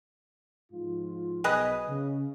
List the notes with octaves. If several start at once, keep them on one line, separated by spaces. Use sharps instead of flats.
G#2 F3 F4
B1 G#4 B4 D#5
C#3